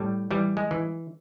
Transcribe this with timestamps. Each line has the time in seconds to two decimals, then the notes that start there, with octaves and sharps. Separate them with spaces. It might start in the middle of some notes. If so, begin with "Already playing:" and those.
Already playing: A2 G3
0.31 E3 G3
0.57 G#3
0.71 E3